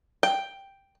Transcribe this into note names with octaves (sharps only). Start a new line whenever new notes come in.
G5